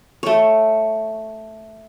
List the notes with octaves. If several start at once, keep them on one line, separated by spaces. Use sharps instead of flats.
A3 C#5